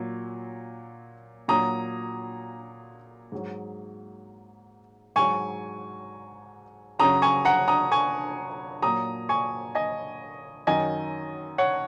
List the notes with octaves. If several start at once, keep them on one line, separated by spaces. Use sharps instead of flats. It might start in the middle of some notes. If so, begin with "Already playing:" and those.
Already playing: A#2 F#3
A#2 F#3 A#5 D#6
G#2 F#3
G#2 F#3 G#5 C#6
F#2 C#3 F#3 A#5 D#6
G#5 C#6
F#5 A#5
A#5 D#6
G#5 C#6
A#2 F#3 A#5 D#6
G#5 C#6
D#5 G#5
F#2 D#3 F#3 D#5 G#5
C#5 F#5